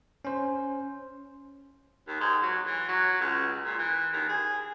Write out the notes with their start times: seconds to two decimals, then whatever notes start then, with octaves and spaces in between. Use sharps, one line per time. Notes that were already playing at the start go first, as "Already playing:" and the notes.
0.25 C#4 C5
2.08 D#2
2.20 G#2
2.42 F#3
2.66 E3
2.88 F#3
3.21 C#2
3.65 A#2
3.79 E3
4.13 D#2
4.29 G#4